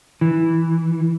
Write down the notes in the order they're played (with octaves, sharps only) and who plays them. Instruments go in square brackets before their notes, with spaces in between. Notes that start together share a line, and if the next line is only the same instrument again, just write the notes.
[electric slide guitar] E3